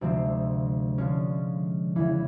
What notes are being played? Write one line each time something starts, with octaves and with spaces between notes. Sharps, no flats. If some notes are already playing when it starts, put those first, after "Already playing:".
D2 C3 F3 G#3 C4
D3 F3 G#3 C#4
E2 C#3 E3